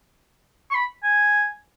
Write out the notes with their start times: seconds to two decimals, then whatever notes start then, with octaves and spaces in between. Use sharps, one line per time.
0.70 C#6
0.75 B5
1.04 G#5